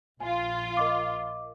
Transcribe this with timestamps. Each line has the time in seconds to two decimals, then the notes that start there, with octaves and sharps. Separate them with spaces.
0.20 A#1 F4 G#5
0.77 A#4 D#5 D6